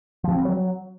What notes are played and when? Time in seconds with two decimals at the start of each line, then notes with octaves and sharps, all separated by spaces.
0.24 F3
0.31 C4
0.38 G3
0.45 F#3